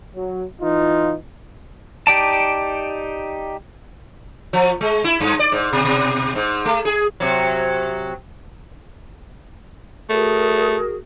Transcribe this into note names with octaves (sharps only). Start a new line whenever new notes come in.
F#3
E3 D#4 F4
D#4 G4 D5 A5
F3
G#3
E4
G2
D5
G#2
B2
B2
G#2
A3
G#4
C3 F#3
A3 F#4 G#4 A#4